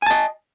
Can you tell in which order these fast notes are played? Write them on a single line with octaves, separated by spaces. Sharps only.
G#5 A5 D#5